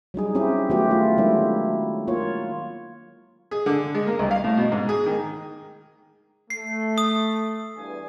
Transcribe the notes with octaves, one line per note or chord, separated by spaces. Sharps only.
F#3 G3 D#4 G#4
C4 C#4 E4 G4
D#3 F#3 A3 B3 F#4 G4
A3 F4
D#3 F#3 G#3 D4 E4
A#3 F4 C#5
G#4
D3
G#3
A#3
C2
F5
A2
B2
G#2
G#4
D#3
A3 C7
D#6
E2 G2 G#5